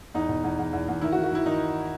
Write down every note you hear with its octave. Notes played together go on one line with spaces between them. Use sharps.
E2 D#4
B2
E2
E2
E2
E2
D#3 E4
F#4
D#3
F#4
D#3 E4
D#3 D#4